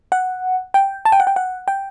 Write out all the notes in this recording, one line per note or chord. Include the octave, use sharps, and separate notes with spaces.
F#5
G5
A5
G5
F#5
G5
F#5
G5